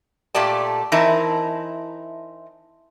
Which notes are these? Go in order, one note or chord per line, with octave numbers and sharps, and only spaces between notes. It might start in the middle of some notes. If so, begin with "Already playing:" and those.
A#2 A3 G4 D5 A5
E3 C4 D#4 E4 A#4 A5